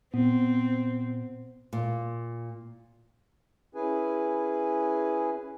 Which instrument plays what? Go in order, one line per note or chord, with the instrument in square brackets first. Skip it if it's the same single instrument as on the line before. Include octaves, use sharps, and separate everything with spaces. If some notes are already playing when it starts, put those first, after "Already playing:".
[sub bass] A#2 [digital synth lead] B3 [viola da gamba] C4
[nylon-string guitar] A#2
[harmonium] C#4 E4 G#4 B4 G#5